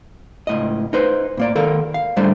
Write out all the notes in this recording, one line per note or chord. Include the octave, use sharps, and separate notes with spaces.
C#2 A2 D#5
D#4 B4 C5
A2 A#3 D5
D#3 A4 A#4 F5
F5
D2 A2 G3 A3 D4 C5